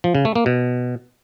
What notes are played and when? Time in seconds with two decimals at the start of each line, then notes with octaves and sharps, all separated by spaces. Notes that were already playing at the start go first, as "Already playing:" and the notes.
0.04 F3
0.15 C#3
0.25 A3
0.36 A#3
0.46 B2